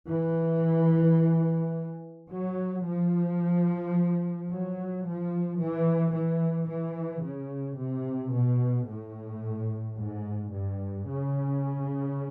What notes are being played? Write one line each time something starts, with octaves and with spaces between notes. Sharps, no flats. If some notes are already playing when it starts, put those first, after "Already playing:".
E3
F#3
F3
F#3
F3
E3
E3
E3
C#3
C3
B2
A2
G#2
G2
C#3